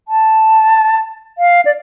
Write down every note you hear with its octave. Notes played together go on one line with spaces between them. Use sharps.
A5
F5
D5